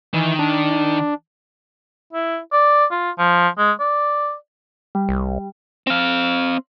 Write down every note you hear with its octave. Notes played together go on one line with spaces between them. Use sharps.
D#3 E3
D4
E4
D5
F4
F3
G#3
D5
G3
C2
C4 F5